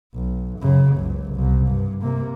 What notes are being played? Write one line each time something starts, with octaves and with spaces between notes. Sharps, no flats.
B1
F#2 C#3
F#1 C#2
C2
G2
C3 A#3